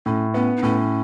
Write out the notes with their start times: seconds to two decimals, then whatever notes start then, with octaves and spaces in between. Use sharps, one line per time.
0.06 A2 C#4
0.34 B3 C#4
0.57 D#4
0.63 A2 C#4